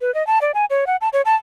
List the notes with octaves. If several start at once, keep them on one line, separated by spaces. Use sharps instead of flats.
B4
D#5
A5
D5
G#5
C#5
F#5
A5
C#5
A5